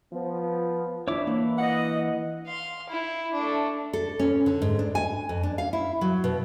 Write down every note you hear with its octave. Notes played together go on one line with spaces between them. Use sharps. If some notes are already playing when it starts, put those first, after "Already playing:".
F3 B3
D4 E4 C#5 E5 D6
E3 A#3
D#5 F#5
F5 C6
E4
A3 D4
A4
C#4
D3
G#2
D4
G#5
F2
D4
F5
E4
F#3
B2